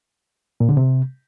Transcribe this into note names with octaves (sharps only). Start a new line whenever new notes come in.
A#2
D3
C3